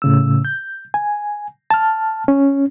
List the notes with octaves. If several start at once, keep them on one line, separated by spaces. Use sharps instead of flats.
A2 C#3 E6
G6
G#5
A5 F6
C#4